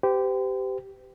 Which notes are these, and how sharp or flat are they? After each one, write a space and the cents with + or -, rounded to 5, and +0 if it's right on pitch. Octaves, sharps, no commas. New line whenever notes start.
G4 -10 C5 -45